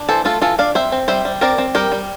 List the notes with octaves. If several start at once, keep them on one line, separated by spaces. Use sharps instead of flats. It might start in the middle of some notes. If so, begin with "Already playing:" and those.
Already playing: D4
E3 A4 C5
A3 F4 A4
E3 F4 A4
D4 D5 F5
C4 C5 E5
C4
G3 C5 E5
G3
C4 A#4 D5
C4
G3 G4 A#4
G3